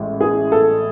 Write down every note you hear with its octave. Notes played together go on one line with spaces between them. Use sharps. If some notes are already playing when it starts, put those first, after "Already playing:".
Already playing: A1 A2 G#3
G#4
A4